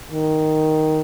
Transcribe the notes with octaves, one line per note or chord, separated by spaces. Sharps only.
D#3